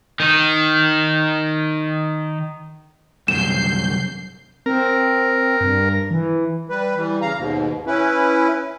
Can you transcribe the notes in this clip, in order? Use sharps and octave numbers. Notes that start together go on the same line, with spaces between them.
D#3 D#4
C2 F#2 G6 C7 E7
C4 A#4
G2
E3
G3 B4
E3 G3
C#3 F5 A#5
D#2 G#2 B2
C#4 E4 B4